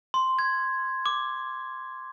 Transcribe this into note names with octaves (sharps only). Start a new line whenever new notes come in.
C6
G#6
D6